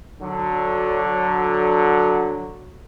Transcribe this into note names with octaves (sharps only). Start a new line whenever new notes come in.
D3 F#3